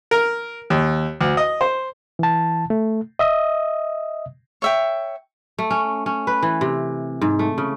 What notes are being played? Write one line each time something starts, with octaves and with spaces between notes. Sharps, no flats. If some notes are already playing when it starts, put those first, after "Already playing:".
A#4
D#2
D2
D#5
C5
E3 A5
A3
D#5 E5 D#6
C#5 E5 G5
A3
C#4
C#4
B4
E3
C3
G#2
A3
C#3